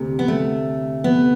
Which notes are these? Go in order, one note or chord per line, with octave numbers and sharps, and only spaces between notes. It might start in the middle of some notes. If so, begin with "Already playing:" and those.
Already playing: D2 C3
B3
A3
B3